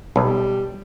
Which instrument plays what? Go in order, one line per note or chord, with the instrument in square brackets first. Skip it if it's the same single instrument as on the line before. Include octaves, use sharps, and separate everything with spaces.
[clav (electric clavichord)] B1 [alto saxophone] G3